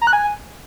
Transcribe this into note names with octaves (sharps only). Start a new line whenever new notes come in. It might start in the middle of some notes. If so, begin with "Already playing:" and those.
A#5
F#6
G#5